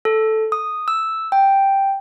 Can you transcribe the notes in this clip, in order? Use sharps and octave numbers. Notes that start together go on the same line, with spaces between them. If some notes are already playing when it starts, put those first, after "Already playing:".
A4
D#6
E6
G5